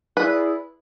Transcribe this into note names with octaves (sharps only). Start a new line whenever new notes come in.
E4 G#4 B4 D5